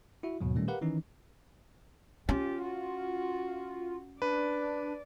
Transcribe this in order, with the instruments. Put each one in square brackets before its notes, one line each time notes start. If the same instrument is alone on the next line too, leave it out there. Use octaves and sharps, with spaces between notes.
[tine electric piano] E4 F#4 E5
D#2 G#2 B2 F#3
A#2 D#3 G3 A3 C#4
G4 A#4 B4 F5 F#5
D#3 E3 C#4 D#4
[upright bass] C#4 [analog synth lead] F4 [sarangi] G4
[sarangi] F#4
[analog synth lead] D4 [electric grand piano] B4 [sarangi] D5